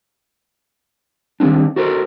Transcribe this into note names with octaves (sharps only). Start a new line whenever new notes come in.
D#3 G3 A3 C4 D4
F#4 A4 A#4 C5